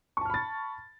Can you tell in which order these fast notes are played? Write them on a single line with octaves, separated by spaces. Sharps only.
C#6 A5 F6 B5 A6